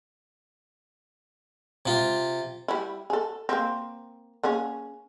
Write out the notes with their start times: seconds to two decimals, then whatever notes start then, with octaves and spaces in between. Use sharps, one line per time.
1.86 C3 F4
2.68 G3 E4
3.10 G#4 A4
3.49 A#3 C4
4.43 A#3 C#4 G#4